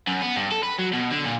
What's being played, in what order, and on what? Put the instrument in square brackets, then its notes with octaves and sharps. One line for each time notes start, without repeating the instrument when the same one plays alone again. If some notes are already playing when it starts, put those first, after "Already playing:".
[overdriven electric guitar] F#2
B3
G2
A4
B4
F#3
B2
D3
A#2